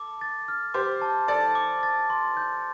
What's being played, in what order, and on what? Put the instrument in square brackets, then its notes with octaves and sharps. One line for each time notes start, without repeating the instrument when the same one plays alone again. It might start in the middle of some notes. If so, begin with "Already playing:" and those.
Already playing: [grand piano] A4 [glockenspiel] D6
[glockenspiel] A6
F6
[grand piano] G4 C5 [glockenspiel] D6
[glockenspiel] A5
[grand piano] A4 D5 [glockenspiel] A6
[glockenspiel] D6
A6
C6
G6